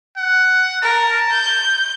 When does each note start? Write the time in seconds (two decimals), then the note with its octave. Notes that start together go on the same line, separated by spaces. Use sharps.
0.17 F#5
0.82 A#4 A5
1.30 G6